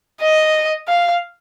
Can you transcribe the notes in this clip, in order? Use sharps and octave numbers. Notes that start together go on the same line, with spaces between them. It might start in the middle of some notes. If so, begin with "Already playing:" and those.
D#5
F5